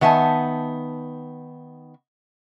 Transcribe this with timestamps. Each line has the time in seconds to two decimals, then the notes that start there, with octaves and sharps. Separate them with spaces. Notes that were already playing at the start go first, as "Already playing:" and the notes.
0.01 D#3 B3 E5 G#5 A5